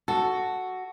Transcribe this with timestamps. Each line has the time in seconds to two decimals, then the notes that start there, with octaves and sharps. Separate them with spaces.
0.08 F#4 A4